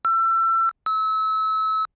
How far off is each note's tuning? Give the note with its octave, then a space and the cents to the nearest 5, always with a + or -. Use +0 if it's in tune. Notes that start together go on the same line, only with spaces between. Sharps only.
E6 +30
E6 -30